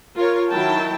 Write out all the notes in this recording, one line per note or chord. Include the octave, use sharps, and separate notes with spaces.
F4 A#4 C#5
D#3 F#3 E4 A#4 G5 A5